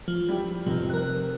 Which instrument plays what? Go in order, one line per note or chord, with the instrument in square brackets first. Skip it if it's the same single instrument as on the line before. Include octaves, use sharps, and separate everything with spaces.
[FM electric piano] F3
[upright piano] G3 E4 G4
[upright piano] F1 F2 C3 [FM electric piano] F3
[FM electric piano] A#4 F#6